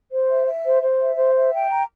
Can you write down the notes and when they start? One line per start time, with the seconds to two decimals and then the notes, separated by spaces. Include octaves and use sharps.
0.11 C5
0.28 E5
0.46 E5
0.65 C5
0.82 C5
1.00 E5
1.17 C5
1.35 E5
1.53 G5
1.70 A#5